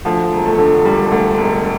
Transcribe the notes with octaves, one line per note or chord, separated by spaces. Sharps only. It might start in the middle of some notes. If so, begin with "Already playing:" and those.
D2 F3
E1
A3
D3
E1 G3
D2
E1